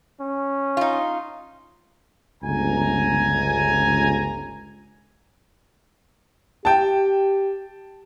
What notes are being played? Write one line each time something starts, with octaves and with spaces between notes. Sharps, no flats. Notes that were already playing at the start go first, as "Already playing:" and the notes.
C#4
D#4 F4
G1 C#2 G#5 A#5
G4 G5 A5